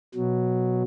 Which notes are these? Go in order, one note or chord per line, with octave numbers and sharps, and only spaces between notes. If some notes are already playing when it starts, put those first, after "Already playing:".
B2 F#3